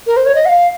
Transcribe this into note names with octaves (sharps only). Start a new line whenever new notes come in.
A#4
C5
C#5
D#5
F#5
F5